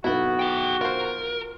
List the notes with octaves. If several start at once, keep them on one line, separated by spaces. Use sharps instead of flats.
B1 F#3 B3 E4 F#4
G#4 G5
F4 A#4 C5